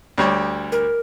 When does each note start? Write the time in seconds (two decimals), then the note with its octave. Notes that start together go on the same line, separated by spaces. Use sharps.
0.18 D2 G3 C#5
0.72 A#4